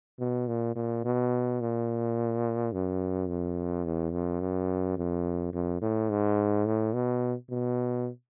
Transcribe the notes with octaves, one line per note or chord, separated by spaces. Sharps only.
B2
A#2
A#2
B2
A#2
F#2
F2
E2
F2
F#2
F2
F2
A2
G#2
A2
B2
B2